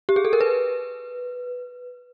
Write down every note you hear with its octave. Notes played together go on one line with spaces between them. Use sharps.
G4
G#4
A4
A#4
B4